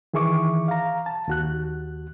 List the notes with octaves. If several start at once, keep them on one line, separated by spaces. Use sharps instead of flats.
D#3 E3 G#4 E5 C#6 D6
F5 A#5
A5
D#2 F#4 F#6